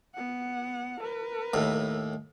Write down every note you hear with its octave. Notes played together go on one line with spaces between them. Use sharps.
B3 F#5
A#4 B4
D#2 A2